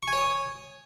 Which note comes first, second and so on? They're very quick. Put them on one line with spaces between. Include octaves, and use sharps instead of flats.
C#6 G#5 C#5 D#6